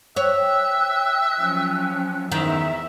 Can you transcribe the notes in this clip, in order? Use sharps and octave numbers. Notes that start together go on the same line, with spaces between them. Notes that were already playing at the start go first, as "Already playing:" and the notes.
C#5 E5 G5 F#6
F3 F#3 C#4
E2 D#3 E5